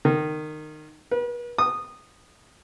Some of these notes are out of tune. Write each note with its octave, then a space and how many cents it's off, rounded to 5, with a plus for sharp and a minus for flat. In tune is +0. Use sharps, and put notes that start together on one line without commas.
D#3 -20
B4 -40
D#6 -15